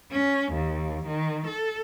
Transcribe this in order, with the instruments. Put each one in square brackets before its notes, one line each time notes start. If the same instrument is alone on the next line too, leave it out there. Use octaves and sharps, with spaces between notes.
[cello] C#4
D#2
D#3
A4